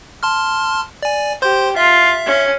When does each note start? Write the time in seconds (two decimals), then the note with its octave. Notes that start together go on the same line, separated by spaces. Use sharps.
0.23 A5 C6 F6
1.03 D5 G#5
1.42 G4 C5 C6 G6
1.76 F4 E5
2.26 C#4